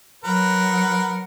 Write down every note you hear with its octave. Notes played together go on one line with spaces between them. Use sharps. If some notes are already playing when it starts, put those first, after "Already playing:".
F#3 A#4 B4 F#5